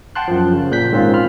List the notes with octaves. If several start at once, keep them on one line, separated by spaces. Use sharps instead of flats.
F#5 G5 A5 C6 F#6
F#2 F3
C#3
A#2 F#6 G6 B6
G#2 D#3 C4 C#4 F4
F4 B5 F6